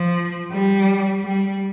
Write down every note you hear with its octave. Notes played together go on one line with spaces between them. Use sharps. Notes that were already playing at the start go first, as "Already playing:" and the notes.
Already playing: F3
G3
G3